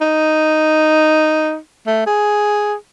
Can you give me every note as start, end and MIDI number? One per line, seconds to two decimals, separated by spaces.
0.01 1.57 63
1.87 2.03 57
2.06 2.74 68